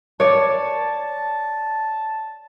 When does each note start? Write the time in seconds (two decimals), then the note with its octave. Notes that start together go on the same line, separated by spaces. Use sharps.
0.20 C#5 D5 A5